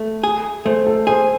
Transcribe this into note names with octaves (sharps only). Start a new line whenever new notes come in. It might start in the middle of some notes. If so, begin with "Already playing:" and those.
Already playing: A3
G#4
A3 C5
A4
G#4 C5